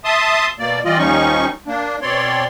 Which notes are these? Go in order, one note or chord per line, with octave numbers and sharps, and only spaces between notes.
E5 A5 C6 D#6
B2 A#3 D5
E3 G3 F4 D5 D#5
D#2 F3 G3 C#4 D#4 C#6
A#3 D4
B2 C4 C#5 D5 C6